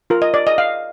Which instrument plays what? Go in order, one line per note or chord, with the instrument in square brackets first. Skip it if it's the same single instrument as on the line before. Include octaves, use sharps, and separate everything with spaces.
[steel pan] F4 A#4
D#5
D5
D#5
F5